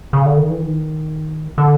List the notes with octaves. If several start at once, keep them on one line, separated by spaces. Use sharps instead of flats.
C#3
D3
D#3
E3
D#3
D3